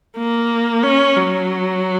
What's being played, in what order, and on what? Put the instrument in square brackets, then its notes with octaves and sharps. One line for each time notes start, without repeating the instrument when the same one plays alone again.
[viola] A#3
C#4
F#3